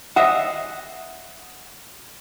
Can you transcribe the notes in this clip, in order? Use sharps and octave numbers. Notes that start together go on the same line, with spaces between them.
D#5 E5 F#5